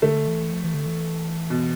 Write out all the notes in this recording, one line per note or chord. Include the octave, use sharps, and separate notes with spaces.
D3 A3
E3
F3
E3
D3
E3
B2